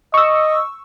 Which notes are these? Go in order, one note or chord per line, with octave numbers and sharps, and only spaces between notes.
D#5 C#6 E6